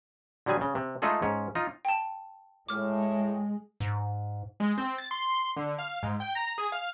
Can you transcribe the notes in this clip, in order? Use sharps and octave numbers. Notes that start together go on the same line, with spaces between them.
D3 F#3 G3 G#4 G#5
C#3
C3
G#3 A3 D#4 F4 G#4 A4
G#2 C#4
D#4 F4
G5 A5
A2 G#3 D6 F6
G#2
G#3
C4
A6
C6
D3
F5
G#2
G5
A#5
G#4
F5